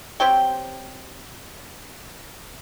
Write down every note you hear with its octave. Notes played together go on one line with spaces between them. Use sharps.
C4 G4 C#5 G5